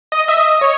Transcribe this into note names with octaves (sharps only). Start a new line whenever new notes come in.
D#5
E5
D#5
C#5